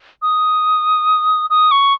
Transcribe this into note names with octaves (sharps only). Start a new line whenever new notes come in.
D#6
D#6
C#6